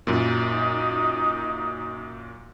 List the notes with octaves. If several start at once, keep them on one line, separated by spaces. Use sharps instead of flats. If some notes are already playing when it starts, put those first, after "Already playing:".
F#2 A#2 D#4